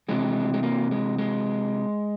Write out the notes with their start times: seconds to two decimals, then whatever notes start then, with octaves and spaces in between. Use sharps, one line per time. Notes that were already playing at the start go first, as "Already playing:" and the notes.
0.08 C3 E3 G#3
0.53 G#3
0.63 A#3
0.91 G#3
1.18 G#3